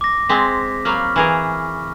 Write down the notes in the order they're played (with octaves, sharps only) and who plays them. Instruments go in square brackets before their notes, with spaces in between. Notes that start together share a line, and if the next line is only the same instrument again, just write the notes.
[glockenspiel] D6 A#6
[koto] G#3 C4 [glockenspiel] B6
[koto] F#3 A#3 F5 [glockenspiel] B5 C#6 F6
[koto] E3 G#4 A#4